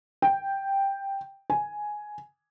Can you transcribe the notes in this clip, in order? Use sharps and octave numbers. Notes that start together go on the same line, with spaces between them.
G5
G#5